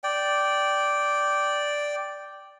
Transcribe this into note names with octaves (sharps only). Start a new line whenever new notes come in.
D5 G5